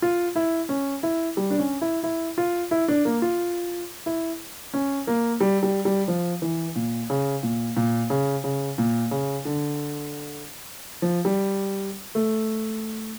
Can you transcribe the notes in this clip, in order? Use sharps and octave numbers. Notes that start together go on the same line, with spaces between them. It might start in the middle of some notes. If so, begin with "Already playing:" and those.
F4
E4
C#4
E4
G3
D4
C#4
E4
E4
F4
E4
D4
A#3
F4
E4
C#4
A#3
G3
G3
G3
F3
E3
A#2
C#3
A#2
A#2
C#3
C#3
A#2
C#3
D3
F3
G3
A3